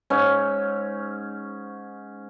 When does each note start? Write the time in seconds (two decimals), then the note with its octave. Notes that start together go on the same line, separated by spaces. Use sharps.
0.10 G#2 C#4